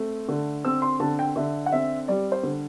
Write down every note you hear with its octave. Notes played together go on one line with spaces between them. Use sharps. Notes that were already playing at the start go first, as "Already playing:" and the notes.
Already playing: A3 C4
D3
C4 E6
C6
D3 A5
G5
D3 E5
F#5
C4 E5
G3 D5
C5
D3